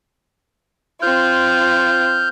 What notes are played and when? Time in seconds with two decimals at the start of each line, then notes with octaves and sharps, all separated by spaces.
1.02 C4 F4 F6 G6